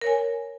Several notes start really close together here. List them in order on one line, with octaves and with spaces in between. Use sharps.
A#4 C#5 G#5